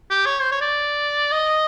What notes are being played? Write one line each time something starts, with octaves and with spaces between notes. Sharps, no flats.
G4
C#5
C5
C#5
D5
D#5